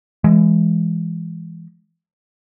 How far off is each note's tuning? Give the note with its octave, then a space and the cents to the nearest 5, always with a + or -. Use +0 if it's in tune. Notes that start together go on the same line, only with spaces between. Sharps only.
E3 +25 G#3 +0